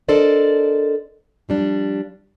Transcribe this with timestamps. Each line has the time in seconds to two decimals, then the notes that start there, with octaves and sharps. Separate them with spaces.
0.08 D4 A4 A#4 C5 D5 D#5
1.49 F3 G3 D4